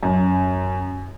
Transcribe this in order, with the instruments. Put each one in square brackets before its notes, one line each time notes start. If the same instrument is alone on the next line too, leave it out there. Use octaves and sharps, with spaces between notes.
[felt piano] F#2